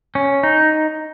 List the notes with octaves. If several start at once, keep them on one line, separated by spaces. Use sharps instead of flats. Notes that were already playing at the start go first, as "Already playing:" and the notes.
C#4
D#4